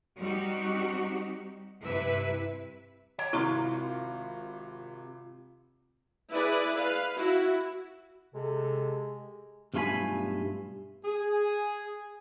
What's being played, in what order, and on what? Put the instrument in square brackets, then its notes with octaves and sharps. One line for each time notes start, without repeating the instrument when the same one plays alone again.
[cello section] G3 C4 D#4 F#4 G4
G2 C3 E4 B4 E5
[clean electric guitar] C#5 D5 A#5
[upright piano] G#1 C3 [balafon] E4 A#5 C6 [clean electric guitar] F4 F5
[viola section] E4 G#4 B4 D5
B4 F5
E4 F#4
[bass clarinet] C3 [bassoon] G#3 [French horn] A4
[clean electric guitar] B1 G2 A3 F4 G#5 B5
[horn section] G#4